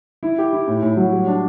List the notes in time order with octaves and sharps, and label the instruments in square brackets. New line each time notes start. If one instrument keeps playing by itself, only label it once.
[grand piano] E4
G4
E4
A2
A2
F#3
G3
D4